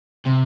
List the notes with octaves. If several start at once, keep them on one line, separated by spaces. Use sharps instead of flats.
C3